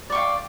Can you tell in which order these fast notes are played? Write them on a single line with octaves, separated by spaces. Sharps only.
D5 C#6 G5 F5